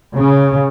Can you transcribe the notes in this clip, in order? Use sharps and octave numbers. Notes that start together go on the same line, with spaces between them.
C#3